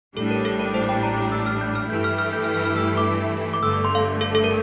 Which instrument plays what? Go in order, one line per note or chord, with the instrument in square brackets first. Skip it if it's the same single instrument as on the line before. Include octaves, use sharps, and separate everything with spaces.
[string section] A1 A2 G3 D4 [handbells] A4
[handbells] A#4
A4
A#4
C5
G5
A#5
D6
E6
F6
G6
F6
[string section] G2 E3 A3 E4 G4 [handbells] G6
[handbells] F6
F6
G6
F6
F6
F6
E6
D6
D6
[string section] G1 G2 D3 A3 [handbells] E6
[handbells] D6
C6
F5
A4
A4
A#4